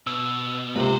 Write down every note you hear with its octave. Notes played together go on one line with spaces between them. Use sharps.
B2 E6
C#2 C3 A#3 B4 C5